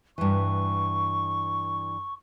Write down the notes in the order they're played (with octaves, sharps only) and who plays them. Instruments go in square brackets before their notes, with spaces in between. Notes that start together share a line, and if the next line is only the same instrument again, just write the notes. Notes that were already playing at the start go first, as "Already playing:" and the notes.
[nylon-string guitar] G2 E3 [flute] C#6